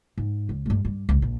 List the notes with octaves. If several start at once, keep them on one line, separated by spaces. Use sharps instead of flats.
G#2
C#2
G2 A3
G2
C#2
A#1